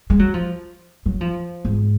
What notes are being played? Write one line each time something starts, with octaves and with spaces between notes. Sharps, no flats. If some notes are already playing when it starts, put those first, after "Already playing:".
G#3
F#3
F3
F#3
F3
G#2